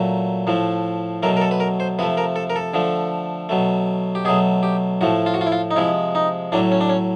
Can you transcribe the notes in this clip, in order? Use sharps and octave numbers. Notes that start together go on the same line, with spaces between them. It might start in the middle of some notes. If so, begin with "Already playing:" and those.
Already playing: A#2 F#3 A3
A2 F3 A3
B2 F#3 A3 A#4
A#4
A4
B4
A#4
C5
C3 F3 A3 B4
A#4
A4
A#4
A4
D3 F3 A3
B2 F#3 A3
G4
B2 F#3 A3 G#4
G4
A2 F3 A3 F#4
F4
F#4
F4
E4
F4
D#4
C3 F3 G#3 E4
D#4
A2 F#3 A3 D4
C#4
D4
C#4